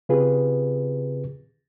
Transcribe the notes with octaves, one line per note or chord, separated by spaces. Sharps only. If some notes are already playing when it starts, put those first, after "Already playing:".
C#3 C4 F4 G4 G#4 B4